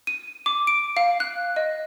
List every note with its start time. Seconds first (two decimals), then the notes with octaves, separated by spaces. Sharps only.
0.07 D#7
0.46 D6
0.67 D7
0.97 F5
1.20 F#6
1.56 D#5